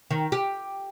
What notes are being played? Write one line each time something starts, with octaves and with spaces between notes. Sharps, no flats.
D#3
G4